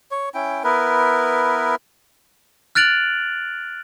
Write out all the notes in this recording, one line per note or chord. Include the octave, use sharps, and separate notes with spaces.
C#5
C#4 E4 G5
B3 E4 A#4 B4
F6 F#6 A6 D7 F7 F#7